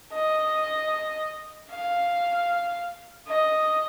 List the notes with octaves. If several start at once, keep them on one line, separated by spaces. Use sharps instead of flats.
D#5
F5
D#5